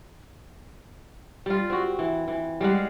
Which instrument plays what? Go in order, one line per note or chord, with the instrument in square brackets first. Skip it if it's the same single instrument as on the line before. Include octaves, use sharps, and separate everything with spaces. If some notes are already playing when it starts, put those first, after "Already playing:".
[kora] G3 F4
C4 F#4
E3
E3
G3 G#3 F5 F#5